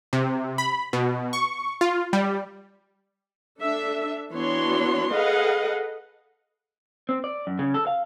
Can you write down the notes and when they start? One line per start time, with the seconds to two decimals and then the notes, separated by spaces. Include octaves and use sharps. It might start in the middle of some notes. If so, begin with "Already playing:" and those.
0.13 C3
0.58 B5
0.93 B2
1.33 C#6
1.81 F4
2.13 G3
3.60 D4 A4 E5
4.34 E3 B3 D4 F#4 C#5 C6
5.12 G#4 A4 B4 D#5 F5 F#5
7.09 C4
7.24 D5
7.47 F#2
7.59 C#3
7.74 A4
7.87 F5